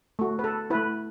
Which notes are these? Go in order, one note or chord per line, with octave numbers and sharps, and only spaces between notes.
A3 F#4
B4
A4
A3 E4 B4